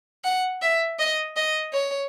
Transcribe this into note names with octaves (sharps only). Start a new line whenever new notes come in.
F#5
E5
D#5
D#5
C#5